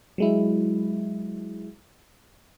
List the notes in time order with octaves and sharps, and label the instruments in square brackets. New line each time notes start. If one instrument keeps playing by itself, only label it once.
[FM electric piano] F#3 G#3 E4